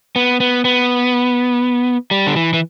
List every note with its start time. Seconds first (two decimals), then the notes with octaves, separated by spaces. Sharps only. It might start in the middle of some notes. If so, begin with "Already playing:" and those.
0.16 B3
0.40 B3
0.65 B3
2.11 G3
2.27 D3
2.36 E3
2.53 E3